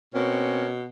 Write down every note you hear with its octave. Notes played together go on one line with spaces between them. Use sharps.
B2 A#3 C4 C#4